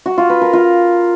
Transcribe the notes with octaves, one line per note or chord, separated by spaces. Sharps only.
F#4
F4
B4
A#4
F4